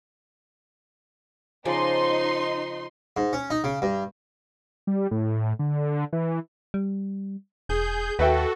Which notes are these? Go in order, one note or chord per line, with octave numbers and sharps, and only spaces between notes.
C#3 F3 D#4 D5 C6
G#2
C#4
D#4
C#3
G2
G3
A2
D3
E3
G3
E1 G#4 G6
D#2 F#4 A4 B4 E5 G5